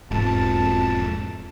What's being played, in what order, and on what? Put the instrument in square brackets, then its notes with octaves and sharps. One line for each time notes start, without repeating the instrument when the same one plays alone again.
[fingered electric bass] E1 G#2 [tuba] F2 [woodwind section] A5